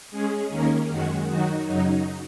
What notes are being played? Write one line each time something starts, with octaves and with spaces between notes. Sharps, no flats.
G#3 C#4 G#4
D#2 D#3 A#3 C#4 A#4
F#2 D#3 G#3 F#4
D#3 F#3 D#4 F#4
F#2 C#3 F#3 D#4